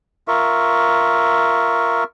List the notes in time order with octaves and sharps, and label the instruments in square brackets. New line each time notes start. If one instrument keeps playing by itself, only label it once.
[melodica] F4 A#4 E5 C#6